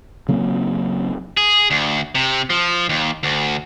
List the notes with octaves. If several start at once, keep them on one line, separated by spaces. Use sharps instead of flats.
C#3 F#3 A#3 C4
G#4
D2
C3
F3
D#2
D2